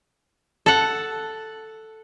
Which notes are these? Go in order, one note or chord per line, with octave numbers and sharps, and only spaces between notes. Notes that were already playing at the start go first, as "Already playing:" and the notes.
A4 F#5